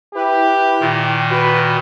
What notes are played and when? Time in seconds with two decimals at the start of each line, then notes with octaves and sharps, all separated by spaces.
0.15 E4 G4 B4
0.80 A#2 D#3
1.31 F#4 B4